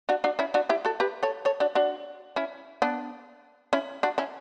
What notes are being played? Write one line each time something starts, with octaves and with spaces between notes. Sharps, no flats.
D4 F#4
D4 F#4
C#4 E4
D4 F#4
E4 G4
F#4 A4
G4 B4
A4 C#5
A4 C#5
D4 F#4
D4 F#4
C#4 E4
B3 D4
C#4 E4
D4 F#4
C#4 E4